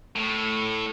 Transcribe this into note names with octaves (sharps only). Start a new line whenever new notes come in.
A2